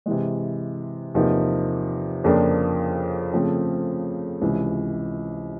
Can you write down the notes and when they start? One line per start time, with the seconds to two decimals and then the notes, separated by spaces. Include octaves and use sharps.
0.06 C3 E3 G#3
1.14 E2 C3 F3 A#3 D#4
2.24 F2 C#3 F3 A#3 D4
3.33 C#3 F3 A3 C4
4.42 C#2 C3 E3